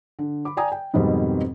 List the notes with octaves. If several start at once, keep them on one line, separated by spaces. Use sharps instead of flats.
D3
B5 D6
D5 G5 G#5 A#5 D#6
G5
F2 G#2 B2 D#3 G3 C4